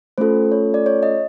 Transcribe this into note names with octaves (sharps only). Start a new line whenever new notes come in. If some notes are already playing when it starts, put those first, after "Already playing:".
A3 C#4 F4 A4 C5
C#5
D5
C#5
D#5